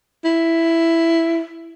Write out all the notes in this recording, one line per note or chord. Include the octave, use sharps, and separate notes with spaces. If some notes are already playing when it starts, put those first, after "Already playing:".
E4